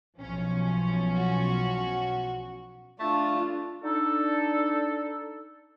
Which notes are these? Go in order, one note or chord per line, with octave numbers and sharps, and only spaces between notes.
B1 F3 C#4
F#4
A3 D4 F4
D4 D#4 A4